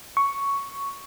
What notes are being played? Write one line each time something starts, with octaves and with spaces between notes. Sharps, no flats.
C#6